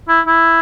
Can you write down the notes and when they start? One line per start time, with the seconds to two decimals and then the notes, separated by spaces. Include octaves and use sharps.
0.09 E4
0.26 E4